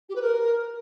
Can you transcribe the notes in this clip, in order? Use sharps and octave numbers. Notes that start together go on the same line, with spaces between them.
G4
B4
A#4